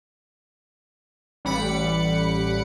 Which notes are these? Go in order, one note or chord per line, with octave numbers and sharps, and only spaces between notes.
A1 G3 F#5 B5 D6 C#7